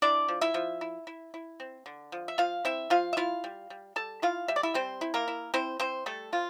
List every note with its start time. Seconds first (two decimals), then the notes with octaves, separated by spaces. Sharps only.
0.02 D4 E4 D5
0.29 F3
0.41 E4 E5
0.54 F3
0.81 E4
1.07 E4
1.34 E4
1.60 C4
1.86 D3
2.12 F3
2.28 E5
2.38 F3 F4 F5
2.65 C4 E4 E5
2.90 F3 F4 F5
3.13 E5
3.17 E4 F4 F5
3.44 G3
3.70 G3
3.96 G3 A4 A5
4.22 E4 F4 F5
4.48 G3 E5
4.56 D5
4.63 E4 E5
4.74 G3 C4 C5
5.01 E4
5.14 A#3 A#4
5.28 E4
5.54 C4 E4 C5
5.80 C4 E4 C5
6.06 G3 A3 A4
6.32 F3 F4